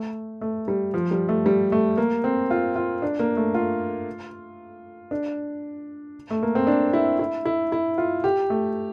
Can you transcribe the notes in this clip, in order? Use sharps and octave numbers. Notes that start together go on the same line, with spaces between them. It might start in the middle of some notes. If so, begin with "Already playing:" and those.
Already playing: A3
A3
G3
F3
G3
A3
G3
A3
A#3
C4
F4
F4
D4
A#3
A3
F4
D4
A3
A#3
C4
D4
E4
E4
E4
E4
F4
G4
A3